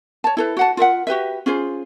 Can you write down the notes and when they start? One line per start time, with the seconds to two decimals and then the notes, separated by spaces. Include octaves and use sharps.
0.24 C#5 A5
0.37 E4 A4 B4
0.57 F#4 F#5 A5
0.77 F4 A#4 E5 F#5
1.07 F#4 G4 B4 E5
1.46 C#4 F4 G#4 C5